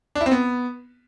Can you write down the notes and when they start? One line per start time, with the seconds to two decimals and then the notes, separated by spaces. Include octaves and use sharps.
0.15 D4
0.21 E4
0.26 C4
0.31 B3